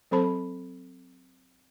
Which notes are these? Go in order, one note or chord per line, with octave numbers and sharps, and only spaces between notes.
F#3 C4 A4 C5 A5 B5